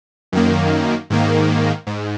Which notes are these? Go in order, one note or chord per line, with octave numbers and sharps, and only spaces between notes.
F#2 D#3 A#3
G#2 D#3 A#3
G#2